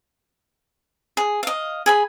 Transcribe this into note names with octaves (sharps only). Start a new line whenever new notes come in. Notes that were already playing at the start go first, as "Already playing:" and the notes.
G#4
D#5 F5
G#4 G#5 B5